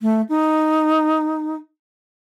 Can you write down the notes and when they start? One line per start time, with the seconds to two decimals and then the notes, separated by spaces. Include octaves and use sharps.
0.02 A3
0.29 D#4